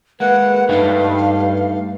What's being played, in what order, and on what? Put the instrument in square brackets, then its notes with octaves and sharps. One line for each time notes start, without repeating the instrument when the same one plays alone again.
[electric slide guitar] G#3 A#3 [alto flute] B4 [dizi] F#5
[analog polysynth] G2 [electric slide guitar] A3 D#4 C#5 [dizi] F5